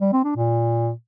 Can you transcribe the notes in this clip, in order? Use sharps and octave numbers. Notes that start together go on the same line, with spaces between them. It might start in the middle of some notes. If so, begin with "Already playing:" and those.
G3
C4
D4
A#2